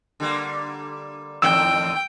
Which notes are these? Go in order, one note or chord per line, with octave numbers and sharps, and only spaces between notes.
D3 G3 A#3
E2 A2 D#3 G5 E6